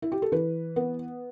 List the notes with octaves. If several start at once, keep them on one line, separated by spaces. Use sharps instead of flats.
E4
G4
A4
E3 B4
B3